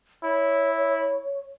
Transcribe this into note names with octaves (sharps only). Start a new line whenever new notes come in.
E4 C#5